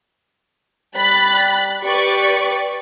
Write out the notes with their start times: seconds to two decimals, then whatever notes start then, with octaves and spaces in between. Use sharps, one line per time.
0.95 G3 B5 F#6 A6
1.84 G4 B4 D5 C#6